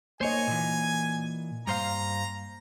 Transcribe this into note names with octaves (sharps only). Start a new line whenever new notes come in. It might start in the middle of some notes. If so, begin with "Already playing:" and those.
A#3 C5 C#5 D#5 G#5
A#2 E3
G2 C5 F5 A#5